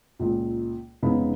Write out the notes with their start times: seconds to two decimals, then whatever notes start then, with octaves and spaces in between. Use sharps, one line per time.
0.19 C#2 A#2
1.02 F1 G#2 C#3 B3 D#4 B5